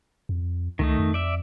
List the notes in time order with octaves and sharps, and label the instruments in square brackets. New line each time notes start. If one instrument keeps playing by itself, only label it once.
[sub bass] F2
[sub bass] C#2 [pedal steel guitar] D#3 A3 D#4
[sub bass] F2
[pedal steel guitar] D5 E5